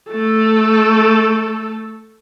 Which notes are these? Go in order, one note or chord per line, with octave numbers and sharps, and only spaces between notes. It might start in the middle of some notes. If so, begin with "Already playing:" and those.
A3 A4